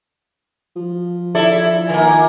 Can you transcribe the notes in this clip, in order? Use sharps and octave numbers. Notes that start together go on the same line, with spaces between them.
F3
E4 A4 D5
D#3 A#3 G#5